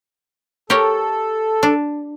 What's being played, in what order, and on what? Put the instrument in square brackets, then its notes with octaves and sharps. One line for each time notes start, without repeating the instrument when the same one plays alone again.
[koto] G4 A#4 C#5 [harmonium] A4
[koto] D4